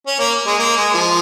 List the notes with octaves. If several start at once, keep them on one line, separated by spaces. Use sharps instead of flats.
C#4
A#3
G#3
A#3
G#3
F3